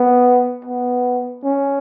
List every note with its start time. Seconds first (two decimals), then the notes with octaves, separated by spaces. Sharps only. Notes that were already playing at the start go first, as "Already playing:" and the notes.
Already playing: B3
0.65 B3
1.44 C#4